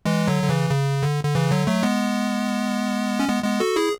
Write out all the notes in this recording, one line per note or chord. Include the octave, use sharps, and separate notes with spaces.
E3 G#3
D3 F#3
D3
C#3 E3
C#3
D3
D3
C#3 E3
D3 F#3
F#3 A3
G#3 B3
C#4
G#3 B3
G#3 B3
F#4 A4
E4 G#4